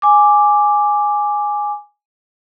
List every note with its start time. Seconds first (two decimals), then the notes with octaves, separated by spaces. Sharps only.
0.02 G#5 D6